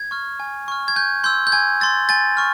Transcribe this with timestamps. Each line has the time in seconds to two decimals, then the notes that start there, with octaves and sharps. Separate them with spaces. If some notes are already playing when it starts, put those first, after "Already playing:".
Already playing: G#6
0.11 C#6 F6
0.40 G#5
0.68 C#6 F6
0.88 G#6
0.96 G#5 G6
1.24 C6 E6 G6
1.47 G6
1.52 G#5 G#6
1.80 C6 E6 A6
2.09 G#5 A6
2.37 C#6 F6